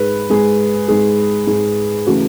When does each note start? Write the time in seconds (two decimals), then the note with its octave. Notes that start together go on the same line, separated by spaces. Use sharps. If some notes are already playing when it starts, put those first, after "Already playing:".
Already playing: G#2 G#3 B4
0.30 G#2 G#3 G#4
0.88 G#2 G#3 G#4
1.47 G#2 G#3
2.07 C#3 E3 A3 F#4